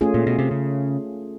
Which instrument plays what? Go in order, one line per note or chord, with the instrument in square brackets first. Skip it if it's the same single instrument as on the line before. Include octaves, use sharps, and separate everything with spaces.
[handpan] A3 C#4 F4 G#4
[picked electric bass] A#2
B2
C3
C#3